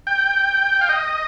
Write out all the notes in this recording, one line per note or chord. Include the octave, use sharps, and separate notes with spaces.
G5
F5
D#5